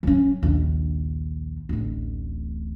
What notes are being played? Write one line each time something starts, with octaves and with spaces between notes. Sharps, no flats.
F#3 C#4
A#1 D#2
D1 A1